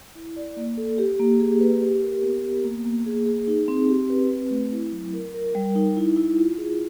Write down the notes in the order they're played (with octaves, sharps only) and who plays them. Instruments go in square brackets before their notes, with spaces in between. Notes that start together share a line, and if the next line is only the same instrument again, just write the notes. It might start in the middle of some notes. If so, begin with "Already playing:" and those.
[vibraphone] E4
D5
A#3
A4
G4
A#3
G#4
B4
G4
A#4
B3
B3
A#3
A#3
G#4
G#4
D#4
C4
G4
B4
C4
A3
E4
F#3
A#4
A#4
G3
D#4
E4
E4
F4
G#4